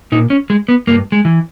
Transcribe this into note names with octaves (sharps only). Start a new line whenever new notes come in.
A#2 D#4
C#4
G#3
B3
G2 A#3
G#3
E3